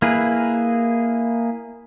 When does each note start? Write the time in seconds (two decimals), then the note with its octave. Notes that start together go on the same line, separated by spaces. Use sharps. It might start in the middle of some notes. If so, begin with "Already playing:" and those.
0.02 A#3 E4 G#4 B4